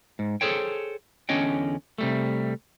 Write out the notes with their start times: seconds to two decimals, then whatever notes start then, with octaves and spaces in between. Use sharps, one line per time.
0.19 G#2
0.41 G#4 A4 C5 C#5 G5
1.29 E2 D3 C#4 C#5 D#5 G5
1.98 C3 G3 A3